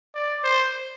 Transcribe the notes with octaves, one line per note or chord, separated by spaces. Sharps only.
D5
C5